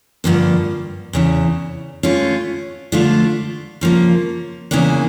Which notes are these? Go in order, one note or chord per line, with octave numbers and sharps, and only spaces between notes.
G2 D3 F3 A#3
E2 C#3 E3
D3 A3 C#4 F4
D3 F3 A3 D4 F4
C#3 F3 A#3
E2 C#3 E3 A#3 D4